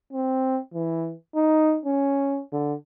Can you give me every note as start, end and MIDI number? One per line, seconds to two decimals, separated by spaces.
0.13 0.59 60
0.74 1.13 52
1.35 1.78 63
1.86 2.41 61
2.53 2.74 50